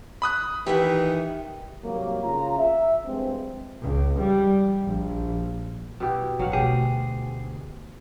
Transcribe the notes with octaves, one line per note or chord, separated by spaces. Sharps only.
B5 D#6 F#6
D#3 E3 G4 E5 F#5
G#2 C3 F#3 G3 A#3
C#3 F4 A#5
E5
G2 F3 G#3 C4
C#2
G3
A#1
B2 E4 G4
D1 F#3 F5 F#5
D2 B2 A3 G4 G#4